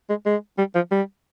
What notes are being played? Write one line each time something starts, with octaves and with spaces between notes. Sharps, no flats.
G#3
G#3
G3
F3
G3